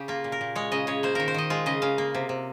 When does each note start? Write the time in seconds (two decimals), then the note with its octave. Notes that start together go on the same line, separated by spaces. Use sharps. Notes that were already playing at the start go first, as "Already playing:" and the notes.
Already playing: C#3 G4
0.08 A#3 F4
0.24 A#2
0.32 A#4
0.41 A#2
0.55 G#3 C#5
0.72 C#3 D#5
0.87 C#3 C#5
1.03 A#3 C5
1.15 D#3 A#4
1.28 C5
1.34 D#3 D#5
1.50 G#3 F4
1.66 C#3 D#5
1.82 C#3 F5
1.98 A#3
2.15 C3
2.29 C3